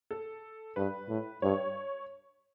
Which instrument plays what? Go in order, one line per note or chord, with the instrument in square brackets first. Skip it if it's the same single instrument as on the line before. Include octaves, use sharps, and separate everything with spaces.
[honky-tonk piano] A4
[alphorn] G2 [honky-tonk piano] B4
[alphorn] A2
[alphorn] G2 [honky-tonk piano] C#5